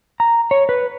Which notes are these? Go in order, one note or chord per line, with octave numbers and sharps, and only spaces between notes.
A#5
C#5
B4